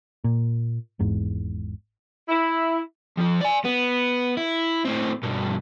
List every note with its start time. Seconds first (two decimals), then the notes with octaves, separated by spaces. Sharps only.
0.24 A#2
0.99 G#1 E2 G#2
2.29 E4
3.18 F2 F3
3.41 D5 G#5
3.65 B3
4.37 E4
4.85 A2 C4
5.23 G2 B2